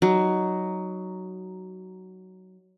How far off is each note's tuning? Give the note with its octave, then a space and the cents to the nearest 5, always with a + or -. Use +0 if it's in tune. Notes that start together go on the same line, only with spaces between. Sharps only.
F#3 +10 D#4 +0